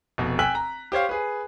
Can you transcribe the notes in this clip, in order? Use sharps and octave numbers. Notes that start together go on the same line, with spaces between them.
F1 B2
G5 G#5 E6 F#6 B6 F#7
A#5
G4 C5 C#5 F5
G#4 B4